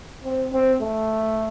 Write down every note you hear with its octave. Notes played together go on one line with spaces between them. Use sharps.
C4
C4
A3